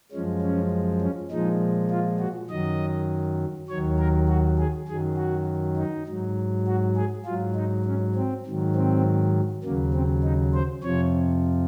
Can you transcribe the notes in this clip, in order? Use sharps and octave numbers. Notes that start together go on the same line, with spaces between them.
F#2 F3 G#3 C#4
C#4
C#4
A#2 F3 G#3 D#4
F4
F#4
F#2 D#3 F#3 D#5
D#2 D#3 F#3 C#5
A#4
F#4
G#4
F#2 D#3 F#3 G#4
F#4
D#4
G#2 F#3
F#4
G#4
G#2 F#3 F4
D#4
C#4
C4
G#2 D#3 F#3
C4
D#2 C#3 F#3 A#3
C4
D#4
C5
F2 C3 F3 C#5